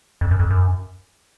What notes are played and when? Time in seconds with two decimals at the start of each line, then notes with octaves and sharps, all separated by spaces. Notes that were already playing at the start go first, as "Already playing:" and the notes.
0.21 F2
0.31 F#2
0.40 F2
0.50 F#2